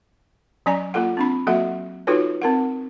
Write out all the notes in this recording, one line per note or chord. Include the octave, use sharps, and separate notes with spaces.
F#3 C#4 D5 G#5
A#3 F4 A4 F#5
C4 D4 B5
F#3 A#3 F#4 A4 E5 F#5
D#4 F4 F#4 A4 B4 C#5
C4 A#4 F#5